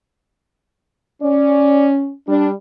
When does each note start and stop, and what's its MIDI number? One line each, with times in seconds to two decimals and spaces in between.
1.23 2.13 61
1.23 1.88 74
2.28 2.53 55
2.28 2.49 62